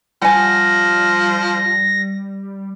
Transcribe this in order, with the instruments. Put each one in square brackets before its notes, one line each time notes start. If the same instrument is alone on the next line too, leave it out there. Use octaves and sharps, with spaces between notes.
[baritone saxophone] F3 [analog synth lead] G3 [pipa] F#5 G#5 [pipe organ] A#6